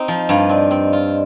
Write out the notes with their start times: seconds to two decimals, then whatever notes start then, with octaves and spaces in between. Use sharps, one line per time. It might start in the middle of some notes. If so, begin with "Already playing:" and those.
Already playing: C4 D#4 D#5
0.08 F3
0.29 G2 F5
0.41 D#5
0.49 C4 D5
0.71 C4
0.93 F4